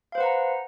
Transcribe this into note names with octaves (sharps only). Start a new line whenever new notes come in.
B4 C5 F5 F#5 A#5